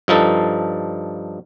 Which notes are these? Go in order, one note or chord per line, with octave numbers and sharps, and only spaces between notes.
G2 F3 D#4 A4